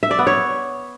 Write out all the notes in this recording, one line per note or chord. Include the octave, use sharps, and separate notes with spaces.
E5
D5
B3
C#5